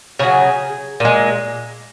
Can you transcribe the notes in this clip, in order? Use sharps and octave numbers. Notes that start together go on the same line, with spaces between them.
C#3 F#3 G#4
A#2 G#3